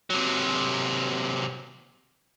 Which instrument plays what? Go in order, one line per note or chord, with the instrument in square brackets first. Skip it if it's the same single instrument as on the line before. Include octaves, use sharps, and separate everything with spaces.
[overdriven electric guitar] C3 F#3